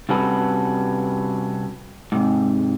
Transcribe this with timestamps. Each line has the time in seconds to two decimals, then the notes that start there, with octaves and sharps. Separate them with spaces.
0.09 C3 G3 C#4 F#4 A4 B4
2.12 G#2 C3